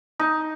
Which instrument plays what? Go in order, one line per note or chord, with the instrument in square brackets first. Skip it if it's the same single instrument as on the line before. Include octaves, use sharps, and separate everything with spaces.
[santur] D#4